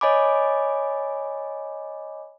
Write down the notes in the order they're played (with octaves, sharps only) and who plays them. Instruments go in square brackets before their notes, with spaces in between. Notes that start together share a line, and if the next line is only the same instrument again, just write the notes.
[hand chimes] C#5 D#5 G#5 B5 D6